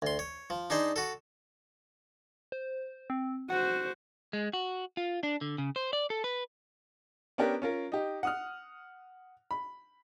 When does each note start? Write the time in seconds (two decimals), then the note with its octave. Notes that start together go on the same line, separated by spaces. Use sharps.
0.02 D2 C6
0.19 C#5
0.50 F3
0.70 D4 D#4 G#4 C5
0.96 F#4 A4
2.52 C5
3.10 C4
3.50 F#4 C5 F#5
4.33 G#3
4.53 F#4
4.97 F4
5.23 D4
5.41 D3
5.58 C#3
5.76 C5
5.93 D5
6.10 A4
6.24 B4
7.38 B3 C#4 D4 G4 A#4
7.62 C#4 F4 A#4
7.92 D#4 G4
8.23 F#5 D#6 F6
9.51 B5